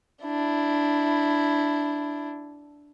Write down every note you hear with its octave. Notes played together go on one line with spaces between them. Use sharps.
D4 E4